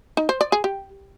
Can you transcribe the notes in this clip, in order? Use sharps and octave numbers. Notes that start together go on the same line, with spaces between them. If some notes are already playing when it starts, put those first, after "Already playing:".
D#4
C5
D5
G#4
G4